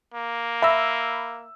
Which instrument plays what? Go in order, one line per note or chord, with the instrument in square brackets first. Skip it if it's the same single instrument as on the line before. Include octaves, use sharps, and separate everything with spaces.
[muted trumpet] A#3
[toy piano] E5 [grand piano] B5 E6